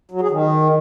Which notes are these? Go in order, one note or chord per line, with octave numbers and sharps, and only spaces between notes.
F#3
G#4
D#3